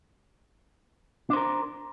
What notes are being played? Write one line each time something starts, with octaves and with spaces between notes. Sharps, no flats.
D4 A#4 C5